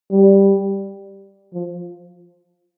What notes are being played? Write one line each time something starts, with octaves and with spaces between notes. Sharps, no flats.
G3
F3